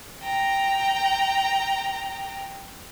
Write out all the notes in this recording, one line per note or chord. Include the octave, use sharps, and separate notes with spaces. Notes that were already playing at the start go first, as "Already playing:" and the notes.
G5 A#5